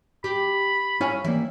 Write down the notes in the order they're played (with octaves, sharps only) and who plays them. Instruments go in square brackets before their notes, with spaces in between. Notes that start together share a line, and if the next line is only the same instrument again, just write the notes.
[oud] G4 [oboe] B5
[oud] C#4 [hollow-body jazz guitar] E4 F5 G#5
[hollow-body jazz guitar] E3 G3 A#3 [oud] E4